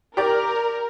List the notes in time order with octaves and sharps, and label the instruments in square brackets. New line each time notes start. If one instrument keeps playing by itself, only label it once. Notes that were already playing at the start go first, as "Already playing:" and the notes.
[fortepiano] G4 D5 [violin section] A#4